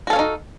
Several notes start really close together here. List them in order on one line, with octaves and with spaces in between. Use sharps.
F#4 A4 F5 C#4 D#4